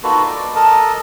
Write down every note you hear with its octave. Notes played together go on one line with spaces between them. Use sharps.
A#3 D#4 F4 F#4 A4 B4
D5
A4 A#4 D#5 A5